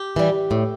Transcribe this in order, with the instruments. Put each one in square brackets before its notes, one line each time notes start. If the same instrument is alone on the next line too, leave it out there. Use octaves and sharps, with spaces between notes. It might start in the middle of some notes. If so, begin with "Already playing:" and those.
Already playing: [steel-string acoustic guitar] G4
E3 G3
A2